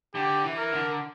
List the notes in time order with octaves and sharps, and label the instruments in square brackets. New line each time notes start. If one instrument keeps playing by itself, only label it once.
[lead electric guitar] D3 [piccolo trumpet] G4
[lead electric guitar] E3
[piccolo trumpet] A#4
[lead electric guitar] D3